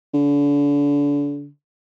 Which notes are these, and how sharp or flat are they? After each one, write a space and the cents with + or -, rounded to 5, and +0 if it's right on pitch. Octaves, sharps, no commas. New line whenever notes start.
D3 -35